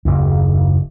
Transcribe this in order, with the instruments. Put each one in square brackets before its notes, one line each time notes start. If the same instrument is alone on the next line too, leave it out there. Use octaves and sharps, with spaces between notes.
[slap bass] F#1 D#2